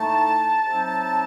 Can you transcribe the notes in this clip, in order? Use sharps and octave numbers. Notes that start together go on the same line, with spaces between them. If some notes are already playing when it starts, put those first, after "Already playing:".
Already playing: A2 A3 D#4 A5
C3 F#3 C4 D#4